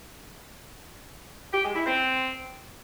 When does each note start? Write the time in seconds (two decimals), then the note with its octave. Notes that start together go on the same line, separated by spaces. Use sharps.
1.53 G4
1.64 G#3
1.75 E4
1.86 C4